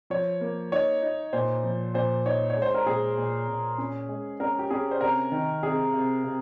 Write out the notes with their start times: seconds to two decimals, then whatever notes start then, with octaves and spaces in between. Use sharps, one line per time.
0.10 F3 C#5
0.41 A#3
0.72 D#4 C#5
1.02 D#4
1.33 A#2 C5
1.64 F3
1.94 A#2 C5
2.26 D#4 C#5
2.50 C#5
2.56 G#3
2.62 C5
2.74 A#4
2.86 A#2 G#4
3.17 A#2
3.48 A#2
3.78 C#4
4.09 G#3
4.40 C#4 A#4
4.59 G4
4.70 C#4 G#4
4.91 C5
5.01 C3 A#4
5.32 D#3
5.62 C3 G#4
5.94 C3
6.24 C3